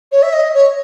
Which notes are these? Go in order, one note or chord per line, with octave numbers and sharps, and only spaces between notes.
C#5
E5
D#5
C#5